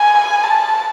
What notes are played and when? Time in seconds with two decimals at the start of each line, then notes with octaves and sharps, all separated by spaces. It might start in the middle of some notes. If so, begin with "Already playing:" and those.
Already playing: G#5
0.44 A5